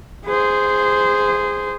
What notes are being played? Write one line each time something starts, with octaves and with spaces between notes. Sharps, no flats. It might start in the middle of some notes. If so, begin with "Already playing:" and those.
G#4 C5